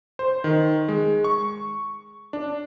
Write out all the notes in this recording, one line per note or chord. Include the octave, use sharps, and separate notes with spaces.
C5
D#3
G#3
C#6
D4